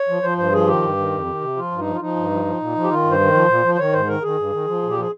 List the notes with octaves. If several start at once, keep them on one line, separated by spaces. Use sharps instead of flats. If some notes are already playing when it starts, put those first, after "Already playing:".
Already playing: C#5
F3
F3 C5
G2 C5
F3 G#4
D#3 G4
G2
D#3
F2
D#3
C3
F3 F4
G2
D#4
F3
F4
F3 D#4
G2
F3
F3
A#2
F3
G4
D#3 F4
G2
C5
D#3
F3
A#2
F3
C5
D#3 C#5
G#2 C5
D#3 A#4
D#3 G#4
G2
D#3
F3
A#2
G4
F3 G#4